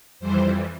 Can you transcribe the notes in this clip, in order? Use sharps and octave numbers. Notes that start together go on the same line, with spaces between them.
F2 E3 G3 C5